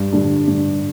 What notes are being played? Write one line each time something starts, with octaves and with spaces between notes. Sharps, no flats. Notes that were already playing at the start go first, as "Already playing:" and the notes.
Already playing: G2
D3 G3 D4
G2